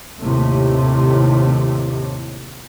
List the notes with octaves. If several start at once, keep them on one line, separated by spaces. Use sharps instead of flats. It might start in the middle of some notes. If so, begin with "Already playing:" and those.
D#2 A2 C3